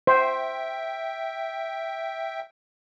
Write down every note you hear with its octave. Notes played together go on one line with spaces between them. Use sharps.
C5 E5 G5